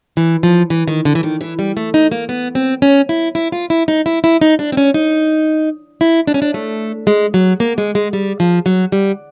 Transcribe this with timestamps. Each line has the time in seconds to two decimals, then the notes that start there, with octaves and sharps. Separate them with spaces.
0.17 E3
0.43 F3
0.70 E3
0.88 D#3
1.05 D3
1.15 E3
1.23 D#3
1.41 E3
1.59 G3
1.77 A3
1.94 D#4
2.12 A#3
2.29 B3
2.55 C4
2.82 C#4
3.09 E4
3.35 E4
3.52 F4
3.70 E4
3.88 D#4
4.06 E4
4.24 E4
4.41 D#4
4.59 D4
4.72 C4
4.77 C#4
4.94 D#4
6.01 E4
6.27 D4
6.34 C#4
6.42 D4
6.54 A3
7.07 G#3
7.34 F#3
7.60 A#3
7.78 G#3
7.95 G#3
8.13 G3
8.40 F3
8.66 F#3
8.92 G3